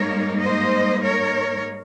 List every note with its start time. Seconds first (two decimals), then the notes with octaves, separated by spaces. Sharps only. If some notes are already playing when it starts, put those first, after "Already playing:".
Already playing: G#2 G3 A#3 D#4 A#4 C#5
0.40 C5 D#5
1.02 A#4 C#5